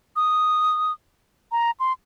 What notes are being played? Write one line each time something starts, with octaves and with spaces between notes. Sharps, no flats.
D#6
A#5
C6